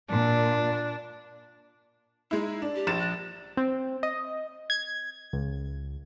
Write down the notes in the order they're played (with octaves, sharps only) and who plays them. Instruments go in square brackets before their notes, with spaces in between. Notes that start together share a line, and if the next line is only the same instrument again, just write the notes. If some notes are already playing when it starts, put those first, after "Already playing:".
[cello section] A#2 [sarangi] D4
[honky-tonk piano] G#3 E4 [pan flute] D#4
[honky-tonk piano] D4
[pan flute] G4
[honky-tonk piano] A#1 A6 E7
[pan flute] F#6
[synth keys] C4
D#5
G#6
C#2